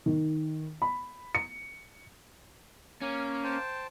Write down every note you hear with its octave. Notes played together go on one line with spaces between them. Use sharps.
D#3
B5
C#7
A#3 C#4
C5 G5 A5